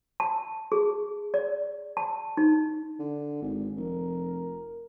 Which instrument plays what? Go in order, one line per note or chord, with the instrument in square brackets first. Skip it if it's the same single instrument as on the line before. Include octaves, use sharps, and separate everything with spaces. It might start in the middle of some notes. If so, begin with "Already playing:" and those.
[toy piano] A5
G#4
D5
A5
D#4
[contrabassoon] D3
G#1
[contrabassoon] F1 [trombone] A#4